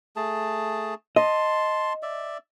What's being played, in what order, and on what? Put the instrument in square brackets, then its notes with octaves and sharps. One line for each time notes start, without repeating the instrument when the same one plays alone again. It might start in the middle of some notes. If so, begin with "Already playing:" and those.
[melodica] A3 G#4 A5
[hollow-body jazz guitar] D#5 [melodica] A5 C6
[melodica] D5 E5